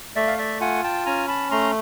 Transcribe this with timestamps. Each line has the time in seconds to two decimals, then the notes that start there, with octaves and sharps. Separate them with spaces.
0.16 A3 D5 E5
0.27 F5
0.38 D5 E5
0.60 F4 F#5 G#5
0.83 G5 A5
1.06 C#4 G#5 A#5
1.28 A5 B5
1.51 A3 A#5 C6